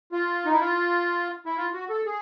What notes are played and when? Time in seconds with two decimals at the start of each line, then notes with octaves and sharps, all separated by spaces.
0.12 F4
0.46 D#4
0.53 E4
0.60 F4
1.46 E4
1.57 F4
1.73 F#4
1.89 A4
2.06 G#4